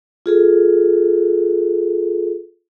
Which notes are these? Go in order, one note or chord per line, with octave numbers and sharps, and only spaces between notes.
F4 G#4 A4